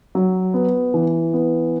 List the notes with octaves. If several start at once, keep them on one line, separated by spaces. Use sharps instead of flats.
F#3
B3
E3
B3